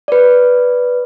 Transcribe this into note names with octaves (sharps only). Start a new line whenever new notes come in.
B4 D5